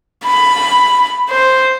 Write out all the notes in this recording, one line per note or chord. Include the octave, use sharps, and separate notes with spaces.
B5
C5